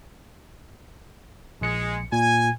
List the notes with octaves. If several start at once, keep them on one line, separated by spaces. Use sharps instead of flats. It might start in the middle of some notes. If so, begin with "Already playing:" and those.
A#1 G#3 C#7
A#2 G#5